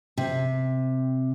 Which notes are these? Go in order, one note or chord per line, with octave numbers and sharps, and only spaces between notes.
C3